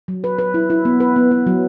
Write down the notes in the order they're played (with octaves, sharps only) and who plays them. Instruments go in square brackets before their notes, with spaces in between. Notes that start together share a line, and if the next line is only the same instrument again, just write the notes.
[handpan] F#3
B4
B4
E4
E4
B3
B4
B3
B3
F#3